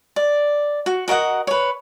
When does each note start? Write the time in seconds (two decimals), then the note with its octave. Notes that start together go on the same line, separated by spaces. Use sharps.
0.16 D5
0.86 F#4
1.08 F#4 A#4 D#5 F#5
1.47 B4 C#5